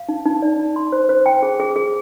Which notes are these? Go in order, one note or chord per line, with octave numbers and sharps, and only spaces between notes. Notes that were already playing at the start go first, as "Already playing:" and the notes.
Already playing: F5
D#4
D#4
D5
D#4
C6
C5
C5
G5
G#4
G#4
G#4